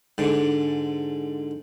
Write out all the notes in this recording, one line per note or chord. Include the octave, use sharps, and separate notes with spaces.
G#2 D3